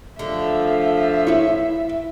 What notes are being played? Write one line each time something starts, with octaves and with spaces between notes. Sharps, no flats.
D3 F3 A3 E5
E4 B4 C#5